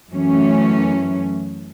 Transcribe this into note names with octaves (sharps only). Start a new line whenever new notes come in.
F#2 E3 F#3 A3 C#4